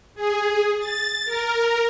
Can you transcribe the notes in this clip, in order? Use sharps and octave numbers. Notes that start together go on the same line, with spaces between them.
G#4
A6
A#4